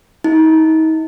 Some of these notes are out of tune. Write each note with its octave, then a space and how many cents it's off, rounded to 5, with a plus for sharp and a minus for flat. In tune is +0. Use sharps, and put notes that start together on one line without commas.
D#4 +35